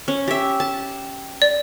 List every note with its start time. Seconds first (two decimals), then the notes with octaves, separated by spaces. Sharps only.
0.08 C#4
0.28 G4 E5
0.60 A5
1.42 D5